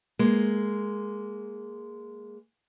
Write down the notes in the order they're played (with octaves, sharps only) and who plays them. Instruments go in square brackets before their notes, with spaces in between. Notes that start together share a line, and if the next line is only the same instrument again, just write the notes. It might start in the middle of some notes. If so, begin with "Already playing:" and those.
[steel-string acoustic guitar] G#3 A#3